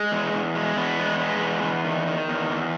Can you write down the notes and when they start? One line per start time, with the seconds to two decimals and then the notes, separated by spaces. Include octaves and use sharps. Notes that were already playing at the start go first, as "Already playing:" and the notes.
Already playing: G#3
0.12 E2
0.34 E2
0.55 G#3
0.76 E2 B3
0.99 G#3
1.20 G#3
1.41 E2
1.63 E2
1.85 D#3
2.07 D#3
2.28 E2
2.50 E2